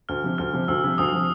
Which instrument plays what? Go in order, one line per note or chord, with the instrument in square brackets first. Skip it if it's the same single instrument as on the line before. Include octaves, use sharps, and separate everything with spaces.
[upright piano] D2 [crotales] F6
[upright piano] C3 F3
[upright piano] D2 [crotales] F6
[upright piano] C3 F3
[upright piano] D2 [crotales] E6
[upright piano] C3 F3
[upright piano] D2 [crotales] D#6
[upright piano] C3 F3